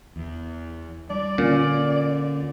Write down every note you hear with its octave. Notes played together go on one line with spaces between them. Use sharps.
E2
G3 D5
A#2 D3 C#4